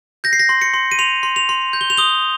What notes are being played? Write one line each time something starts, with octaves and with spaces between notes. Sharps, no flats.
G6 A#6
C7
A#6
C6
C#7
C6
D#7
C6 F7
C6
F7
C6
G6
G7
F7
D#6 G7